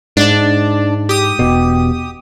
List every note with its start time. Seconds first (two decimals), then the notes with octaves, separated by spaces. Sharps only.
0.17 G#2 D4 D5
1.09 G4 D#6
1.39 E1 B2